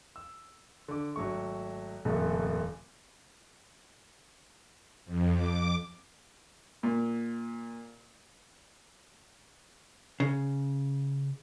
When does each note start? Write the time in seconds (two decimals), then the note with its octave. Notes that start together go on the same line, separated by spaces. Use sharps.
0.16 E6
0.88 D3 D6
1.16 G#1 F#3 A3 C#6
2.05 D#1 F2 C#3 A3 A#3
5.05 F2
5.34 D6
6.83 A#2
10.20 C#3